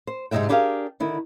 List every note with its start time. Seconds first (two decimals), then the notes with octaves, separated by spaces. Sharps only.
0.07 C5
0.31 G#2 C3 F#3 D#4 E5 G5
0.49 D4 E4 G4 G#4 A#4 F5
1.00 D3 D#3 E4